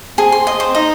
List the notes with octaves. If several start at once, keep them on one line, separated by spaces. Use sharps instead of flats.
C4 G#4
C6
D#5
C5
C4
D#4 D#5